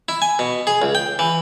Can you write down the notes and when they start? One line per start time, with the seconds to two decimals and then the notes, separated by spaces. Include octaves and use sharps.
0.09 E4
0.22 G#5
0.39 B2
0.67 G#4
0.82 C#2
0.95 G5
1.19 E3